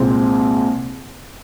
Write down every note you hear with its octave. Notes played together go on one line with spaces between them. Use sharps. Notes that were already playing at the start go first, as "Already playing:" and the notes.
Already playing: C2 A#2 G#3 C4